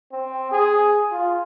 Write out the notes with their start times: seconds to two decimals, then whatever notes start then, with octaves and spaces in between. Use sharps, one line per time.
0.12 C4
0.52 G#4
1.12 F4